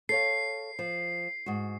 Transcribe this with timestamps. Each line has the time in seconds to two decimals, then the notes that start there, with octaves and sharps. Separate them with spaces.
0.09 A4 C#5 F5 C7
0.79 F3
1.46 G#2 F#4